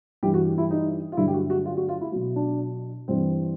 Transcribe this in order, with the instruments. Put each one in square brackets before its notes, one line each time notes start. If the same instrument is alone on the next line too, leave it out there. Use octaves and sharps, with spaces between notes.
[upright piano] G2 E3 G3 G4
F#4
E4
D#4
F4
G2 D3 F#3 E4
G4
F#4
F#4
F4
F#4
F4
E4
B2 F#3
D4
G2 E3 G3 C4